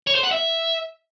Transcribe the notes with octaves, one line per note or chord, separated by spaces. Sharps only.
C#5
C5
F#5
E5